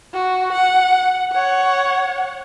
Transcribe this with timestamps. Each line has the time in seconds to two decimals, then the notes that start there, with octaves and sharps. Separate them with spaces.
0.13 F#4
0.53 F#5
1.32 C#5 F#5